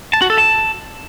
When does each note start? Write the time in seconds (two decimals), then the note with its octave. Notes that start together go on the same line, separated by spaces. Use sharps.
0.13 A5
0.22 F#4
0.30 A4
0.38 A5